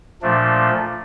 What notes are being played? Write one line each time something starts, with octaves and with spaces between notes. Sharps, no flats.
A#2 F3 A3 D4